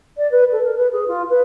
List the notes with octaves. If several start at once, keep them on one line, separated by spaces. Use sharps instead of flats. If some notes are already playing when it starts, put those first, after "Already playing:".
D5
B4
A4
A#4
B4
G#4
F4
B4